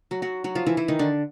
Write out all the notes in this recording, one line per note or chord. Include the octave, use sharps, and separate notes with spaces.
F#3 F#4
F#3 F#4
F#3 F#4
F3 F4
E3 E4
E3 E4
D#3 D#4
D3 D4